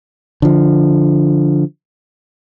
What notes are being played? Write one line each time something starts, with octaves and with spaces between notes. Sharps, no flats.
D3 F3